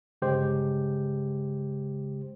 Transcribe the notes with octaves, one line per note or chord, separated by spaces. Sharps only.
G1 C#3 G#3 G4 C5